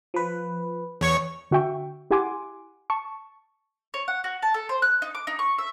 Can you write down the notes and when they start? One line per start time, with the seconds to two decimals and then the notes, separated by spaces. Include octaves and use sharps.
0.14 F3 B4
1.01 E2 C#5 C#6
1.51 D3 F#4 E5 G5 C#6
2.11 E4 G4 F#5 G#5 C6 D6
2.90 A5 C#6
3.94 C#5
4.08 F#5
4.24 F#4
4.43 A5
4.54 A4
4.69 C5
4.82 F#6
5.02 D#4
5.15 D6
5.27 D#4
5.39 C#6
5.58 E5